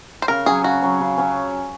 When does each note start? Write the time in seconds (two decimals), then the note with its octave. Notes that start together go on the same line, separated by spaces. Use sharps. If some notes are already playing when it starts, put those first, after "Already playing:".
0.22 C5
0.28 C#3 A#4
0.46 F#3 C#4 G#4
0.64 C#3 F#4
0.82 F#3 C#4
1.00 C#3
1.18 F#3 C#4